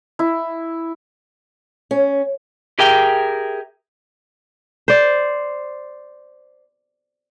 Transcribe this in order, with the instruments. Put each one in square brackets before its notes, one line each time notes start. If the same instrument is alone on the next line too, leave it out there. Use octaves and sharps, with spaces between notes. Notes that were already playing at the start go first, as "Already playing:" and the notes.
[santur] E4
[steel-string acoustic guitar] C#4
[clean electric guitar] G4 G#4 A#4 E5 G5
[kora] C5 D5